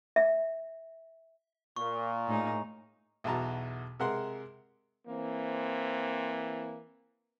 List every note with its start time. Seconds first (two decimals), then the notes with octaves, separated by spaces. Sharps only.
0.16 E5
1.76 A#2 C#6
2.27 A2 G#3 D#4
3.24 B1 E2 F#4 A5 A#5
4.00 C3 G#3 A#4 F#5 C6
5.08 E3 A#3 C4